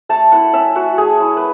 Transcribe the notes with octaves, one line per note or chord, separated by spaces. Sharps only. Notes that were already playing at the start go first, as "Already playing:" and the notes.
A3 A5
E4 F#5
C#4 E5
A3 F#4
A3 G#4
E4
B4